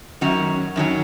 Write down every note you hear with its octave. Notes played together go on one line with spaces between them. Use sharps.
F#2 D#3 F#3 C#4 F#4
F#2 D#3 F#3 C#4